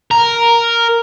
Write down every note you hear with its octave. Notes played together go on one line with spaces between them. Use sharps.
A#4